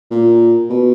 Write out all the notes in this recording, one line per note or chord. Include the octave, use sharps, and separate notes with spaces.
A#2
B2